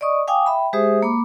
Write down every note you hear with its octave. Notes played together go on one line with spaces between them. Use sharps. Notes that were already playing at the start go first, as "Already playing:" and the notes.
D5 D#5 C#6 D#6
F5 G5 G#5 D6 D#6
E5 G5 B5
G#3 G4 G#4 C5 E5 D#6
A#3 B5 D6